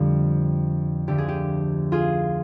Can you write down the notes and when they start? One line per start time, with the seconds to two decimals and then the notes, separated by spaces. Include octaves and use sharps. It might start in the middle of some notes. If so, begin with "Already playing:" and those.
Already playing: F2 D3 G3 F4 G4
1.08 D2 D3 F3 G4
1.18 G#4
1.28 G4
1.92 F4 G#4